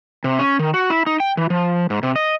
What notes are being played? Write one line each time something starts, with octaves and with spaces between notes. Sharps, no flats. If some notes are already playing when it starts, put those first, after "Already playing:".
C3
C#4
D#3
F#4
E4
D#4
G5
E3
F3
G#2
C3
D#5